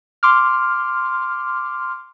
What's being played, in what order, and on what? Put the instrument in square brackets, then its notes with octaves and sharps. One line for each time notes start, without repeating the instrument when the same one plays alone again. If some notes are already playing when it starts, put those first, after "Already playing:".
[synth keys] C6 D6 F6